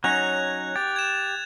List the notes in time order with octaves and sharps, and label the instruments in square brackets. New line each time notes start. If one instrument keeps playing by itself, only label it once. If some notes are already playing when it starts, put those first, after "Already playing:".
[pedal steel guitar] F#3 C#4 D#4 [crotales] F#6 G#6 F7
[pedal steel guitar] G4 [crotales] A6
[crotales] G#6 E7